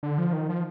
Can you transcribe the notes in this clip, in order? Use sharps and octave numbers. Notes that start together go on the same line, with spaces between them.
D3
F3
D#3
F3